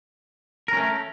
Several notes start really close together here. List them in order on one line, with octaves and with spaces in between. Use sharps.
A#4 C#4 A3